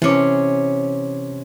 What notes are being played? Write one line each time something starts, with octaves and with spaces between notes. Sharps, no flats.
C3 E3 C#4 D6